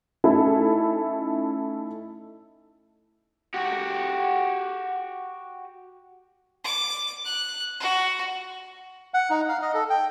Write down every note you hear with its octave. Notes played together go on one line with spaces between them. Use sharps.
A3 C#4 D#4 E4 A4
F#4 G4
D6
F#6
F#4
F#5
D#4
F5
D#5
A4
G5